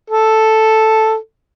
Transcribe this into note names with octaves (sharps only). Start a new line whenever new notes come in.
A4